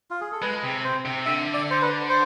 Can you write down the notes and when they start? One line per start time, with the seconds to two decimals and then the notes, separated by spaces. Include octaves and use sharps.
0.11 F4
0.21 G#4
0.32 A4
0.42 G#3 B4
0.63 C3
0.84 C5
1.05 C3
1.26 D3 E5
1.54 D5
1.71 C5
1.82 B4
2.10 C5